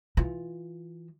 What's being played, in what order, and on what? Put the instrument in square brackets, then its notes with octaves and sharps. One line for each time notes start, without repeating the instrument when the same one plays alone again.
[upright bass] E3 F4